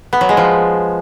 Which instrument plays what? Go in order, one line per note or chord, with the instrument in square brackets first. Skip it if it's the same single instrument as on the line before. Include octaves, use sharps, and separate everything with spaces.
[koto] B3
F#3
G#3
F3